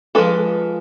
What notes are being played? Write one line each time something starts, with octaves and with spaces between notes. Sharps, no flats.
F3 G#3 B3 D4 A4 B4